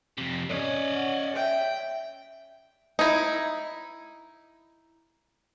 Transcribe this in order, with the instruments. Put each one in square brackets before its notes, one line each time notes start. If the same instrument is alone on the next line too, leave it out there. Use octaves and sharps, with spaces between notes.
[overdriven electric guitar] F2 C3
[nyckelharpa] C#4 [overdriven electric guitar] D5 D#5
[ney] F#5
[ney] E5 [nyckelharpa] G5
[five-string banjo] D#4 E4